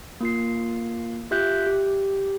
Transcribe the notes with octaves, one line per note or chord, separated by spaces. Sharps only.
A#3 F4 C7
F4 G4 E5 F#6 G6 B6
G4